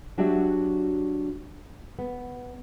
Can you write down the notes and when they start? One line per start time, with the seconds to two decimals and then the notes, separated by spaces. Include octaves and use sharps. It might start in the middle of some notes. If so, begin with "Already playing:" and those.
0.18 F#3 D4 F#4 G4 D5 E5
1.99 B3